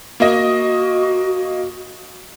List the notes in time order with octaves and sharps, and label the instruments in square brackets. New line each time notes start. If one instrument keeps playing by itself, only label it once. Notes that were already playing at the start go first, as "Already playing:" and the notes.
[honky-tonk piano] A#3 D#5 [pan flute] F#4